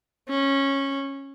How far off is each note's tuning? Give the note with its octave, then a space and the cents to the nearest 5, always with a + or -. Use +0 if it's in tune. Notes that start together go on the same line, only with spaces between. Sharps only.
C#4 -15